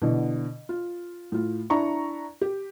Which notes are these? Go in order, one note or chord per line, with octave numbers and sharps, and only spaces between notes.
B2 D3 E3
F4
A2 F4
D4 E4 A#5 C#6
G4